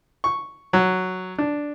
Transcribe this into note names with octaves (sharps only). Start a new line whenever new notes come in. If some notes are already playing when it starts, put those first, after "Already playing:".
C#6
F#3
D4